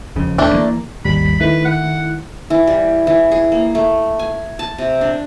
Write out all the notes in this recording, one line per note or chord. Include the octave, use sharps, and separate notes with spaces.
E1 F2 C#3
E1 D2 D3 A3 D4
E3 A#3
G#1 D#2 G3 B5
D#3 A3 E4 B4
F#5
E3
G3
E3
G#4
A#3
A3
G#5
A5
C3
D4